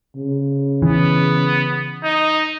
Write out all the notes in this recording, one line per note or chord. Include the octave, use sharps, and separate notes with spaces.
C#3
E3 B3
D#4